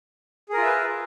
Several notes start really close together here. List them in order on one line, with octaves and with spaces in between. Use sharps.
G#4 A#4 F4 E5 B4